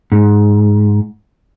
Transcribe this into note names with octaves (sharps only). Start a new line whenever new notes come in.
G#2